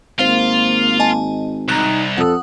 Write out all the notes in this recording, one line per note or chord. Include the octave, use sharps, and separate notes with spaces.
G#1 A#3 F4 C5 F5
D#5 G#5 A5
C2 D#4 A#5 F#6
F2 A4 F#5 D#6